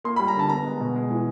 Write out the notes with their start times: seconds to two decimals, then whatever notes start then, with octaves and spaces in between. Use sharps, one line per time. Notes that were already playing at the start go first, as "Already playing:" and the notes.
0.04 A#3 C6
0.16 B5
0.19 G3
0.28 A#5
0.35 D3 A5
0.49 B3 A#5
0.64 G#3
0.80 B2
0.96 G#3
1.11 E3